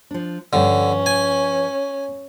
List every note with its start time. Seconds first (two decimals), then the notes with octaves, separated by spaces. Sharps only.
0.11 F3 D4
0.53 G2 D3 F3 C#4 E5
1.06 G#5